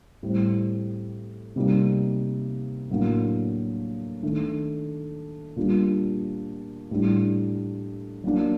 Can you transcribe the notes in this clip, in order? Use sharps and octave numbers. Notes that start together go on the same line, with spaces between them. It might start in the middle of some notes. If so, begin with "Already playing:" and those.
A2 G3 C4
C3 G3 A#3 D#4
A2 F#3 A#3 D4
D#3 A3 D4
A#2 G3 D4
A2 G3 D4
F#3 A#3 D4